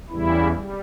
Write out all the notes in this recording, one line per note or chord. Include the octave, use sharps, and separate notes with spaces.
E2 C#3 E3 G3 E4
G3